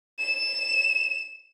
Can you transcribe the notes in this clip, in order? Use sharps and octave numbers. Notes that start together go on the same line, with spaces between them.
E7